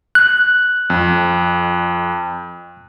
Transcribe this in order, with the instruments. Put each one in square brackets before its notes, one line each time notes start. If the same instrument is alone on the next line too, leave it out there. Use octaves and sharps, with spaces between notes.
[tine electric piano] F#6
[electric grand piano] F2